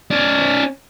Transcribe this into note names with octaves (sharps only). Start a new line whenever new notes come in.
C#4 D5